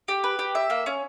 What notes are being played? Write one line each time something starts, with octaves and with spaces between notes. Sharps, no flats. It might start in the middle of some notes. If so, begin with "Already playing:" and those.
G4
B4
G4
E5
A#3
C#4